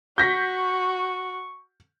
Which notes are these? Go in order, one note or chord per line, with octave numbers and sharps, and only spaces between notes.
F#4 C#6 G6 A#6 B6